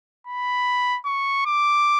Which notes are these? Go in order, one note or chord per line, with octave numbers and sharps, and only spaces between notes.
B5
C#6
D6